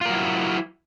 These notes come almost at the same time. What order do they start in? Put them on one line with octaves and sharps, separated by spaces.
F4 A#4 F#3 E4